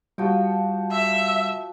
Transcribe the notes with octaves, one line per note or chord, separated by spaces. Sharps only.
F3 G3 F#4 G5
E5